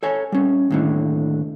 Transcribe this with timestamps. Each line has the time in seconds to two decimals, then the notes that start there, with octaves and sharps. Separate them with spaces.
0.03 A4 C#5 G#5
0.32 G3 C#4
0.71 D#2 A2 D3